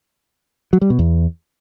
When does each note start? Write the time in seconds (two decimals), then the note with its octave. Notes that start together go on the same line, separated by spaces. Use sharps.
0.73 F#3
0.81 G3
0.90 B2
0.99 E2